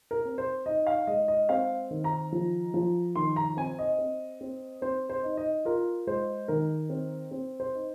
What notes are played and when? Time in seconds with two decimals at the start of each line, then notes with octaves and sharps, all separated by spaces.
0.11 A#4
0.25 C4
0.38 C5
0.66 D#4 D#5
0.87 F5
1.07 G#3 D#5
1.28 D#5
1.49 C4 F5
1.91 D#3
2.04 A#5
2.32 F3
2.74 F3
3.16 D#3 C6
3.36 A#5
3.57 C4 G#5
3.79 D#5
3.98 C4
4.41 C4
4.82 C4 C5
5.10 C5
5.23 D#4
5.37 D#5
5.65 F4 A#4
6.07 G#3 C5
6.48 D#3 A#4
6.89 C4
7.31 C4
7.60 C5
7.74 D#4